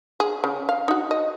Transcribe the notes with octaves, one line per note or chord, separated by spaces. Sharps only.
G#4
C#3
F5
D#4 F#4
D#5